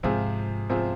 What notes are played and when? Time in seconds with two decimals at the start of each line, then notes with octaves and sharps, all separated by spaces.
0.03 G#2 C3 F3 C4 F4 G#4
0.70 C3 F3 C4 F4 G#4